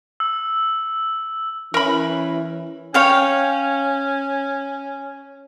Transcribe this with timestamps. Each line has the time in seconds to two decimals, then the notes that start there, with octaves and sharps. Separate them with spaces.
0.20 E6
1.74 E3 C#4 A#4 B5
2.94 C#4 C#5 F5 G5